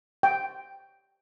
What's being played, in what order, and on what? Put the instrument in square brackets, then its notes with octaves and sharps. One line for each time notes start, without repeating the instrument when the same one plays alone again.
[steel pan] G5